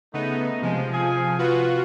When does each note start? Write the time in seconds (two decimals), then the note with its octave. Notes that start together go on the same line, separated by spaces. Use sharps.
0.14 C#3 A3 B3 D#4
0.62 C3 F3 G#3
0.92 G#4 F5 G#5
1.39 F4 F#4 B4